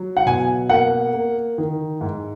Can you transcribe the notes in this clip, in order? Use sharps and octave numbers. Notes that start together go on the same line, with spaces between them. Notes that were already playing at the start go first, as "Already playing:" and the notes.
Already playing: F#3
F#5
B2 G#5
A#3 F#5
A#3
D#3
G#2